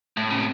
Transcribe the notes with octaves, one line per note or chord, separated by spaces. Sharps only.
A2
C#3
C3